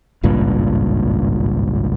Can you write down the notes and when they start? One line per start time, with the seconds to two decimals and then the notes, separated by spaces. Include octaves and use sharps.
0.23 G#1 C#2 G2 A#2